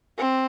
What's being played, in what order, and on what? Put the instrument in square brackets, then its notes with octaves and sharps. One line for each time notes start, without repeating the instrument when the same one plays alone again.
[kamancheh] C4